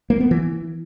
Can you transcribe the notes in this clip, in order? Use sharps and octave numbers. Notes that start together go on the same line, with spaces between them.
A#3
B3
E3